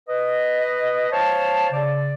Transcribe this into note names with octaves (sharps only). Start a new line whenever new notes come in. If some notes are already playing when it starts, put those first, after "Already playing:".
B4 D#5
C5 C#5 F5 A5
C#3 D5